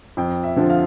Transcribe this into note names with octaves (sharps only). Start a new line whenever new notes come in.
F2 G5
E5
D3 F3
F5